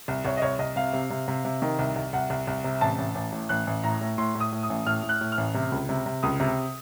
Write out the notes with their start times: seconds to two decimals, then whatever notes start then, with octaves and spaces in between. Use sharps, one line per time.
0.08 C2
0.25 C2 C#5
0.37 D#5
0.42 C2 C#5
0.59 C2 D#5
0.76 C3 F5
0.93 C3
1.10 C3
1.28 C3
1.45 C3
1.62 D#3
1.79 C2
1.96 C2
2.13 C2 F#5
2.30 C2
2.47 C2
2.64 C3
2.81 A1 A5
2.98 A1
3.15 A1
3.32 A2
3.49 A1 F#6
3.67 A1
3.84 A2 A#5
4.01 A2
4.18 A2 C6
4.35 A2
4.40 D#6
4.52 A2
4.63 D#6
4.70 A1
4.86 A2 F6
5.03 A2
5.09 F#6
5.21 A2
5.32 F6
5.37 A1
5.54 C3
5.72 C#2
5.89 C3
6.06 C3
6.23 C#2 D#6
6.40 C3